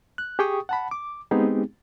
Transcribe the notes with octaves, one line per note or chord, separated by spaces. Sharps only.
F#6
G4 G#4 G5 C#6 D#6
F#5 A5 B5
D6
G#3 B3 C4 D#4 G4 G#4